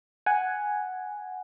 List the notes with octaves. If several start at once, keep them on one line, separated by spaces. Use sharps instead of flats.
F#5 G#5